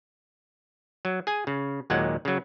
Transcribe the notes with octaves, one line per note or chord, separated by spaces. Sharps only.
F#3
G#4 G#5
C#3
D#2 A#2 F#3 G#3 F#5
C#3 F#3